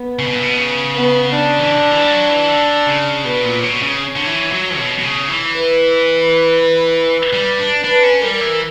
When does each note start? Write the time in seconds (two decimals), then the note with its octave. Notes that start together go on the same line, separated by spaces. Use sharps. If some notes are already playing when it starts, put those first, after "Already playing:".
Already playing: B3
0.19 C#3
0.27 B2
0.35 A#2
0.43 B2
0.57 C#3
0.95 B3
1.34 D4
1.59 E3
1.72 D3
1.91 E3
2.01 G3
2.10 F#3
2.30 E3
2.49 D3
2.87 C#3
3.24 B2 B4
3.44 A#2
3.63 B2 C#5
3.82 C#3
4.16 D3
4.27 E3
4.52 F#3
4.78 B2
4.99 B2
5.04 C#3
5.29 E3
5.54 B4
7.33 G3
7.59 D4
7.84 D4 B4
8.03 C#4
8.22 G3 A#4
8.41 E3